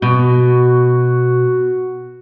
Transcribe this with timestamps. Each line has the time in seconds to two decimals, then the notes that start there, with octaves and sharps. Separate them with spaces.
0.02 B2 F#4